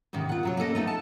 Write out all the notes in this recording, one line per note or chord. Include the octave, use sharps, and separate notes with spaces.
E2 G#2 C3 D#3
F4 F#5
C3 F#3 C#5
A#3 C#4 A4 D#5
A3 B3 D#4
A5